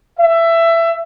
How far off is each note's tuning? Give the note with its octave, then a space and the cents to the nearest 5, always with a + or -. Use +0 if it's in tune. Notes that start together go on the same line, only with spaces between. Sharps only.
E5 +20